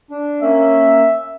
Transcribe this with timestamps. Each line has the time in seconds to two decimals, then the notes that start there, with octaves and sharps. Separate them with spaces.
0.11 D4
0.42 A#3 C#4 E5